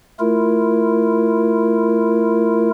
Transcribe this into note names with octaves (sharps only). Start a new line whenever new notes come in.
A3 E4 F4 A#4